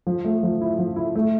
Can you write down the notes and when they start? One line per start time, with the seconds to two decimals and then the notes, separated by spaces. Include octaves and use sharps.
0.07 F3
0.25 A3
0.43 F3
0.61 E4
0.79 F3
0.96 E4
1.15 A3